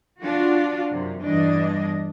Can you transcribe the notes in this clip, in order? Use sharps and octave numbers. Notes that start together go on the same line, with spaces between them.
D4 F4 F#4
F#2 C3
E2 G2 E3 D4 D#5